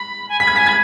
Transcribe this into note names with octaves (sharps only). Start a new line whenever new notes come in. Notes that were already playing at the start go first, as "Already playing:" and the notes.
Already playing: B5 B6
G#5
B5 B6
G#6
G#5 B6
B5 G#6